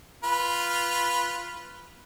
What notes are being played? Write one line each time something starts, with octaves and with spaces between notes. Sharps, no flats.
F4 B4